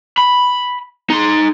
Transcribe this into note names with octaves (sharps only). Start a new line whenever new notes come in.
B5
D#4 C6